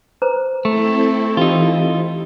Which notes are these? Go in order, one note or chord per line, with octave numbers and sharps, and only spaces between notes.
B4 C5 A#5
A3 C4 E4 A4
E3 D#4 F4 G4